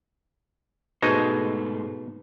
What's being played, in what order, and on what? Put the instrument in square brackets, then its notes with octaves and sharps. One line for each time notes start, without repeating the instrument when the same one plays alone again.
[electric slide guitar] G#2 A3 C5 [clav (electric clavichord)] B2 G#3 D#4